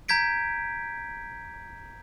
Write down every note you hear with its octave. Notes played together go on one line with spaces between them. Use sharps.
A#5 G6 G#6 B6 D7